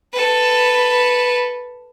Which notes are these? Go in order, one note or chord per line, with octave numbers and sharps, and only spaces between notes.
A4 B4